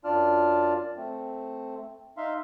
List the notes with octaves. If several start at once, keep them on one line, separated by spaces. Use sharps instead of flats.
F#2 D4 F4 D5 A5 F6
A3 C4
D#4 E5 F5 C6